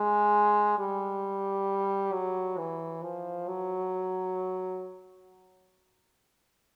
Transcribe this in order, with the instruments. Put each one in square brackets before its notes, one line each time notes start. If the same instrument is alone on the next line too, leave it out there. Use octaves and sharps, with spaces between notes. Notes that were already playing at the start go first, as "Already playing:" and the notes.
Already playing: [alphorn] G#3
G3
F#3
E3
F3
F#3